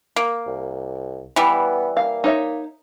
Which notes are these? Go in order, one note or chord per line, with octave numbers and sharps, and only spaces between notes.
A#3
C2
E3 G3 B3
A#3 F5
D#4 C#5 E5